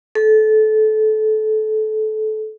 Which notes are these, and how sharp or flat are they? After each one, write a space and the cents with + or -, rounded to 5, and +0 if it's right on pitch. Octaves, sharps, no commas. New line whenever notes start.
A4 -25